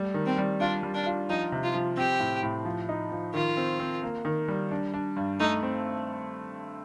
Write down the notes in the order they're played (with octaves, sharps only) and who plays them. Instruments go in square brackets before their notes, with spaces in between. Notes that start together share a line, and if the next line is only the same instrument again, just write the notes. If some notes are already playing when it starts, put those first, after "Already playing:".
Already playing: [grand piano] G3 A3
D#3
[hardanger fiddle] C4
[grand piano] G3
[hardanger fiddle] D4 [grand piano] F4
[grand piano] G3
[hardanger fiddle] D4
[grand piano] F4
[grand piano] F3 [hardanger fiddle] D#4
[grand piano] C3
[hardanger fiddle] F4
[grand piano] F3
[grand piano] C4 [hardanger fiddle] G4
[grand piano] A2
A2
F3
D#4
F3
[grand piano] D#3 [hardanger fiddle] F4
[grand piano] C4
C4
A#3
D#3
G3
D4
D4
G2
[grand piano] A3 [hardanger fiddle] D#4
[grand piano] C4